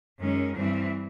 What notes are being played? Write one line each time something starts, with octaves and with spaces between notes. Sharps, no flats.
F#2 D#3 G#3 C#4
G2 E3 G3 C4